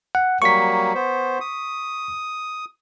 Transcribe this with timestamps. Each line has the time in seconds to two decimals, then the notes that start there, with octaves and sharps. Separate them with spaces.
0.15 F#5
0.42 F#3 G3 A#3 C#6 B6
0.95 B3 C5
1.41 D#6